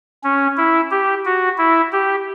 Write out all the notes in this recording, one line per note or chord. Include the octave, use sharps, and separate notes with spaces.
C#4
E4
G4
F#4
E4
G4